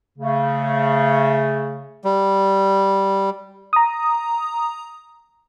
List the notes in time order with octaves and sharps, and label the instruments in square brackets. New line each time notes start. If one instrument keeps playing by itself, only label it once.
[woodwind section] C#3 A3
[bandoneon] G3
[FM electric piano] A#5 D#6